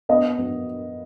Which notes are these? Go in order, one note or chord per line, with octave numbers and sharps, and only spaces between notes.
B3 D#5
B3